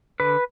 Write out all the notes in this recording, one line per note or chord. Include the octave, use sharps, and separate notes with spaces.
D3 B4